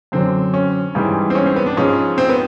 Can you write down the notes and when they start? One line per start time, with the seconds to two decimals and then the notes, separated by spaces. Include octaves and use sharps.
0.12 F#2 D3 F#3 C4
0.54 C#4
0.95 G#2 E3 G3
1.30 C4
1.35 C#4
1.46 C4
1.56 B3
1.66 D4
1.77 G#2 F3 G#3 C#4
2.18 C4
2.29 B3